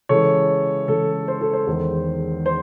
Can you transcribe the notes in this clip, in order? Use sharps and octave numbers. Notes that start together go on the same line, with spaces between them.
C#3 E3 G#3 A4 C#5
C#3 E3 G#3 A4
C5
A4
C5
E2 D#3 G#3
C5